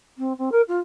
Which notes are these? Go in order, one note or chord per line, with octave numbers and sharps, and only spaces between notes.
C4
C4
A#4
F4